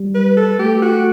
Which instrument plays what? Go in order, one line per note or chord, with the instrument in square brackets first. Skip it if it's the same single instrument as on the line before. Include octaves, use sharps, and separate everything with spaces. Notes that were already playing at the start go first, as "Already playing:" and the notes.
Already playing: [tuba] G3
[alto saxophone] B4
A4
[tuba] A3 [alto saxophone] G4
[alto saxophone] F#4